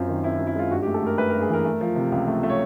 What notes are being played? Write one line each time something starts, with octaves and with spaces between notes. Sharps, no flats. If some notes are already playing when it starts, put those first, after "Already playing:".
Already playing: F#2 C4 F4
D#3
C4 E4
E4
F#2
E4
G#3 F4
G2 F#4
G4
A3
A4
A3 A#4
A3 B4
A#4
G2
G#4
E3 A#4
A3
F3
C3
C#2
A3
A3
C#5